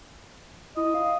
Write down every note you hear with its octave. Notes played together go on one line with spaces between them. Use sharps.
E4 D#5
F5